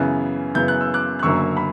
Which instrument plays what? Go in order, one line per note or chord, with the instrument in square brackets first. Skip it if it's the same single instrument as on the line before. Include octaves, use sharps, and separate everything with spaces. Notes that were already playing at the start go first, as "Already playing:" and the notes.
Already playing: [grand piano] F#2 C#3 E3 B3 F#6
F#2 C#3 E3 B3 G6
F#6
E6
D6 F#6
F#6
F#1 F#2 D3 F#3 A#3 C#6 E6
B5